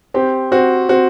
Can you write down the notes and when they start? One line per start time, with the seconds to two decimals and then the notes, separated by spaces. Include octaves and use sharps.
0.14 C4 G4
0.52 C4 F#4
0.89 C4 F#4